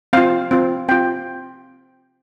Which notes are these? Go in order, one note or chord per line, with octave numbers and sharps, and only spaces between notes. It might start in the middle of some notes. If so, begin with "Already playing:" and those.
C4 F4 F5
C4 F4
C4 F4 G5